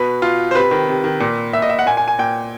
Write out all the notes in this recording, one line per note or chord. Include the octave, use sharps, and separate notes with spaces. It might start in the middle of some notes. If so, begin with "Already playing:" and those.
Already playing: B2 B4
B2 F4
C5
C3 B4
D#3
C3
D#3
A#2
A#2 E5
D#5
E5
F#5
A#2 G#5
G#5
G#5
A#2 G5